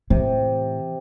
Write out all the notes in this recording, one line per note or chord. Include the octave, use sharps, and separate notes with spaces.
A2 C3 E3